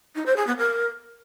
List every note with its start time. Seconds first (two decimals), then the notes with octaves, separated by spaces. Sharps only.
0.15 D#4
0.25 C5
0.36 G#4
0.46 B3
0.57 A#4